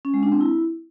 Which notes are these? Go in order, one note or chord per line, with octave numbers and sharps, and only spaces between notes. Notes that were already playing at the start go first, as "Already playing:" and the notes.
C#4
G#3
D4
C4
E4